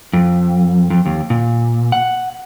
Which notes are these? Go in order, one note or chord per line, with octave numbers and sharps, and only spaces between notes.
F2
F2
D#2
A#2
F#5